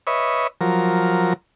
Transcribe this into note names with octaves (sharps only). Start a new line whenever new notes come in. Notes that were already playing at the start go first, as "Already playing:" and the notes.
B4 C#5 D#5 E5 C#6
F3 F#3 A#4